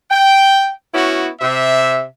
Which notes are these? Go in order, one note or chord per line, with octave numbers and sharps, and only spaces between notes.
G5
B3 C#4 E4 F#4
C3 E5